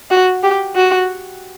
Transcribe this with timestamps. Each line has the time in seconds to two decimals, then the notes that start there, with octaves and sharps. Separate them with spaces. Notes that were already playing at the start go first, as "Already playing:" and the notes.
0.11 F#4
0.43 G4
0.75 F#4